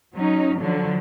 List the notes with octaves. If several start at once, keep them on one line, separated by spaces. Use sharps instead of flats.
F#3 C#4 D#4
D3 F3 F#3